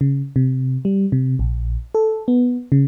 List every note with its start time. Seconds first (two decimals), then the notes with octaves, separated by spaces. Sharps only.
0.01 C#3
0.36 C3
0.85 G3
1.12 C3
1.39 A#1
1.95 A4
2.28 B3
2.72 C#3